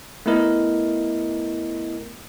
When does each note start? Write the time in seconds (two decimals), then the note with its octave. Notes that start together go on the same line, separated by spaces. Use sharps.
0.26 A3 B3 E4 A#4 D#5